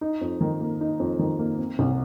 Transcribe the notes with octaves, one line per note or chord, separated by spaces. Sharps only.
D#4
F2
D#3
A#3
D#4
F2
D#3
A#3
C4
C2